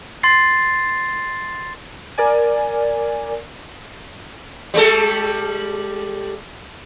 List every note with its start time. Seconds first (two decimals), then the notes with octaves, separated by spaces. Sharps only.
0.23 C6 A6 C7
2.18 A#4 D5 G#5
4.74 G3 G#3 A4